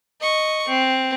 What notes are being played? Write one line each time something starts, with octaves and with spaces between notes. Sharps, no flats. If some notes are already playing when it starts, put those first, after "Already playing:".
D#5 C#6
C4